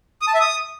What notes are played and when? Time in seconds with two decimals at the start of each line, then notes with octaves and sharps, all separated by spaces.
0.22 D#6
0.28 A5
0.34 E5
0.40 D#6